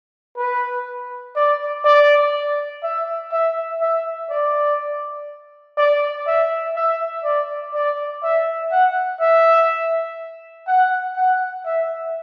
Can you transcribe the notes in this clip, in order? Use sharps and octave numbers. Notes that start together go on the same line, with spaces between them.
B4
D5
D5
E5
E5
E5
D5
D5
E5
E5
D5
D5
E5
F#5
E5
F#5
F#5
E5